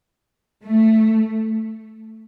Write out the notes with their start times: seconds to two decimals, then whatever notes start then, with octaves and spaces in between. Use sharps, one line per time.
0.64 A3